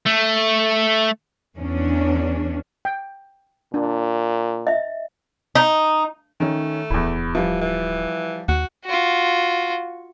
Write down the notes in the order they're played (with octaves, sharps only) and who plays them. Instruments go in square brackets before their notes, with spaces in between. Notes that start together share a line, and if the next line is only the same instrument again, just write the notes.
[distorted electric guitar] A3
[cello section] E2 C#4 D4
[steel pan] G5
[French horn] A#2 [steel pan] D4
[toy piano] D#5 E5
[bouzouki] D#4
[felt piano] D#3 C#4 [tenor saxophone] A3
[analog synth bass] D1 [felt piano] E2 E4
[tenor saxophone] E3 [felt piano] F3 G3
[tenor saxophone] E3
[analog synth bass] D#2 [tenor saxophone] F#4
[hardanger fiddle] F4 F#4